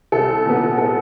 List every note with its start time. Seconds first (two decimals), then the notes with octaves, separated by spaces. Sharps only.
0.12 C2 A4
0.45 A#2 F#3 B3
0.78 A4